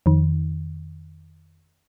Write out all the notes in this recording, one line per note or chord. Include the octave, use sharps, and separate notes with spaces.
F2 D#3